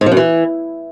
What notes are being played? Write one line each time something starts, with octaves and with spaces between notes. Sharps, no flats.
G#2
F3
F#2
E3